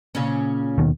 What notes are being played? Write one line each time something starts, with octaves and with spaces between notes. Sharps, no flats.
A#2 C#3 C#4
D#2 B2 D#3